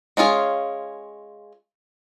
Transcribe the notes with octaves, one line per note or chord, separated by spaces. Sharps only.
G#3 C#4 F4 G#4